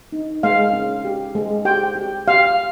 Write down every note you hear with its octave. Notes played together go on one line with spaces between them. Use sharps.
D#4
G#3 F5
C#4
G4
G#3
G4 G5
G4
G4 F5